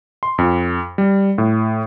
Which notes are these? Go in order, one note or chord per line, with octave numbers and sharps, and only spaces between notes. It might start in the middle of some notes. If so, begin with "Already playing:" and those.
C6
F2
G3
A2